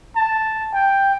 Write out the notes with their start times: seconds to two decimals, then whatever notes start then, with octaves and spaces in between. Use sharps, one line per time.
0.16 A5
0.73 G5